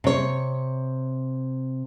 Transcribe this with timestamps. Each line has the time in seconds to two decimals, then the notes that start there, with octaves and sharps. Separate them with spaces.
0.04 C3 C#5